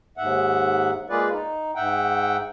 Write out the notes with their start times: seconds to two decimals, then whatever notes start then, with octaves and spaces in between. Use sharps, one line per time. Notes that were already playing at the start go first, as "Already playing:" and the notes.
0.18 D#2 G#2 E5 F#5
1.10 G#3 A#3 F4 G#4 B4 D5
1.32 D#4
1.76 G#2 E5 F#5 G5